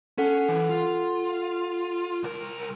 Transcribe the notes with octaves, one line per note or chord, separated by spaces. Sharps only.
C#4 A4 F#5
E3
F4
C2 A#4